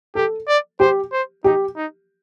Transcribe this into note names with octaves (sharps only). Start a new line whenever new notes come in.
G4 A4
D5
G4 C5
C5
D#4 G4
D#4